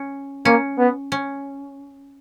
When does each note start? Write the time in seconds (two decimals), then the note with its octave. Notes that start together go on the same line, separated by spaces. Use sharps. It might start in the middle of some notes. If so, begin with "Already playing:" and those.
Already playing: C#4
0.45 A#3 C#4
0.78 B3
1.12 C#4